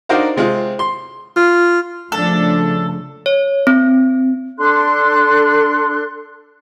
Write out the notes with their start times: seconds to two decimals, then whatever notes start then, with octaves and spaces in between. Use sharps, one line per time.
0.09 D4 D#4 F#4 A#4 C5 F5
0.36 C3 G#3 C4 F4
0.79 C6
1.36 F4
2.12 C#3 F3 A3 D4 A4
3.26 C#5
3.67 C4
4.58 D4 A4 C6 F#6